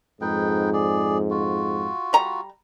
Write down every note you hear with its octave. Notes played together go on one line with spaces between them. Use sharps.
F2 G#2 D#4 B4 G5
G#4 D5
F4 F#4
G3 A#5